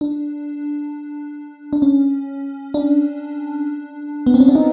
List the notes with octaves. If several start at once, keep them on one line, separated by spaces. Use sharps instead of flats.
D4
D4
C#4
D4
B3
C4
C#4
D4
D#4